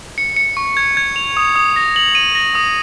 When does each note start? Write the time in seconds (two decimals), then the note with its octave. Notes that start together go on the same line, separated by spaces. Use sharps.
0.18 C#7
0.36 C#7
0.57 C#6
0.77 G#6
0.97 G#6
1.16 F7
1.37 D#6
1.56 D#6
1.76 A#6
1.96 F#7
2.15 D#7
2.35 A#6
2.55 D#6